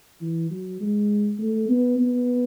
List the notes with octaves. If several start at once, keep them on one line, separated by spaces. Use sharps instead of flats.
E3
F#3
G#3
A3
B3
B3